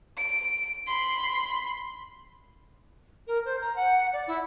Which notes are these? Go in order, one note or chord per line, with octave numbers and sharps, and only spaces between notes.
D7
B5 C6
A#4
C5
A#5
F#5
D5
E4